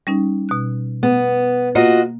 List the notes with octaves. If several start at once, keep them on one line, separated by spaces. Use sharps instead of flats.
G3 C#4 D#4
B2 F#6
B3
A#3 F4 F#4 D#5